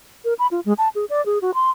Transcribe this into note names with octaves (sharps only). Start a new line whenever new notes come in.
A#4
B5
F4
G#3
A5
G#4
D5
G#4
F#4
C6